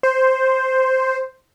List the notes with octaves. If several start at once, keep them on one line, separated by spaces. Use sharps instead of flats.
C5